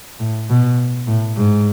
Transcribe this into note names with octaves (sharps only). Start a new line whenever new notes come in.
A2
B2
A2
G#2